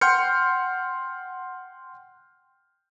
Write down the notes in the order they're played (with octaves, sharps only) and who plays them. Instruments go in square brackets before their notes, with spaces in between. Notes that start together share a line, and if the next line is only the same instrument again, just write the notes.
[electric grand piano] F#5 G5 C6 F6 G6 C#7